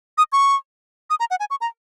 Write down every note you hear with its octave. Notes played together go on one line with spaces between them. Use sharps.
D#6
C#6
D#6
A#5
F#5
G#5
C#6
A#5